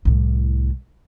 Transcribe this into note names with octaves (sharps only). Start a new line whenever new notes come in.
C2 A2